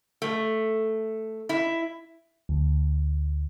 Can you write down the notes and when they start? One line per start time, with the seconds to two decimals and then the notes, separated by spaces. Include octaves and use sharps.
0.22 A3
1.49 E4
2.49 D2